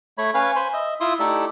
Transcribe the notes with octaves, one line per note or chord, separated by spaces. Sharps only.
A3 C#5 B5
C#4 B4 C#5 F5
C5 G#5 B5 C6
D#5 E5
E4 F4 E5 C6 D#6
A3 D#4 E4 G4 A4 D5